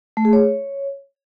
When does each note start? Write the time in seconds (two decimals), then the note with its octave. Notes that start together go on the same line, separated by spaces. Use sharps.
0.17 A3
0.25 G#4
0.33 C#5